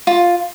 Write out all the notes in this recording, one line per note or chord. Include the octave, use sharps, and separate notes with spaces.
F4